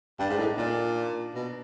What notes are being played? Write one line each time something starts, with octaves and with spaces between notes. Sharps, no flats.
G2 D4
G#2
A2 D#4
A#2 D4
B2